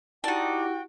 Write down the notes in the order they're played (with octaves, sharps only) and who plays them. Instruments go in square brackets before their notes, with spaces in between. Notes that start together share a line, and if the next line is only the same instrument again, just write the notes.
[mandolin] D#4 D5 [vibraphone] E4 G4 [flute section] F#4 G5 [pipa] A5